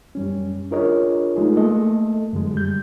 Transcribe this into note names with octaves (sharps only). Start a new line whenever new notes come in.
F#2 G3 C#4
D4 F4 G#4 A#4 C#5 D#5
G#3 A3 D#4 F4 G#4
A3 A#3 A4 D#5
F#2 D3 G#3
G3 G6